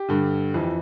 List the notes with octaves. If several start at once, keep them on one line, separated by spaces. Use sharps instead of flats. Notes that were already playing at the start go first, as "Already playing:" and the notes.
Already playing: G4
G2 D3
F2 E3